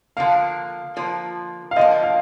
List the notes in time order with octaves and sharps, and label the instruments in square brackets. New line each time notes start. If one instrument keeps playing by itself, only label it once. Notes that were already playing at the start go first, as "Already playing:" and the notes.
[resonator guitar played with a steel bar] D3 F3 A#3 [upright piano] F5
[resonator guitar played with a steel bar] D3 F3 A#3
[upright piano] F5
[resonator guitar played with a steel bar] D3 F3 A#3 [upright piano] D#5
[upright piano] F5